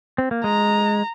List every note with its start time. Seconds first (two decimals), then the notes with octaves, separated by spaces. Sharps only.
0.18 C4
0.31 A#3
0.44 G#3 A#5